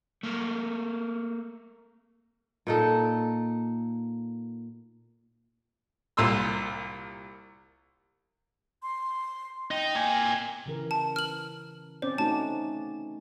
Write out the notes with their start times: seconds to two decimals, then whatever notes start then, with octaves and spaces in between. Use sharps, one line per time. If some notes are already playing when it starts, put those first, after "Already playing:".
0.23 A3 A#3
2.67 A#2 D#4 A4
6.17 C2 A#2 C6 E6
8.83 C6
9.71 D#4 G5
9.95 A#3 G#5
10.66 C#3 E3 A#4
10.91 A5
11.16 F6 F#7
12.02 C4 C#4 C5 D5
12.18 A3 D#4 F#4 A5